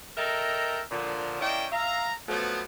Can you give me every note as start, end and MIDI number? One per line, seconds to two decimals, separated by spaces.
0.17 0.80 69
0.17 0.80 70
0.17 0.80 75
0.17 0.80 76
0.17 0.80 79
0.17 0.80 82
0.91 1.40 46
0.91 1.40 50
0.91 1.40 53
1.40 1.66 58
1.40 1.66 61
1.40 1.66 64
1.40 1.66 74
1.40 1.66 75
1.40 1.66 79
1.71 2.11 76
1.71 2.11 77
1.71 2.11 82
2.29 2.62 53
2.29 2.62 54
2.29 2.62 57
2.29 2.62 59